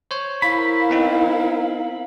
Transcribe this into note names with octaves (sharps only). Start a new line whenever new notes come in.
C5 C#5
E4 A#4 F5 B5
B3 C4 D#4